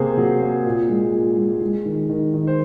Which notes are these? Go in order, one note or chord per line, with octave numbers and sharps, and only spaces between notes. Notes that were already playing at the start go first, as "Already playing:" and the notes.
Already playing: C3 A#3 G#4 C5
F#3
A#3
A#2
G#3
A#2
G#3
G#3
D#3
D#3
D#3
C5